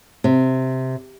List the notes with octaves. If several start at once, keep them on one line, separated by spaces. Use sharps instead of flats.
C3